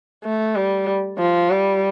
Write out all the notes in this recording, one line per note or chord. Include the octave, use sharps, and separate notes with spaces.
A3
G3
F3
G3